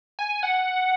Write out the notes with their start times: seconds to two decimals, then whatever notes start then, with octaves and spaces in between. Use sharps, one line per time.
0.19 G#5
0.43 F#5